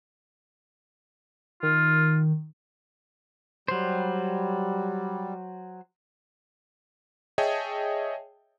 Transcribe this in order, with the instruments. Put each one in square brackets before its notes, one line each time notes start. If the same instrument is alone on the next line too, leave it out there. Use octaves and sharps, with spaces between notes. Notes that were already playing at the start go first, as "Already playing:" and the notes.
[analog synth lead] D#3 [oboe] F4
[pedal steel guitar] F#3 C5 [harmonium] G3
[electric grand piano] G#4 C#5 D#5 E5 G5 A5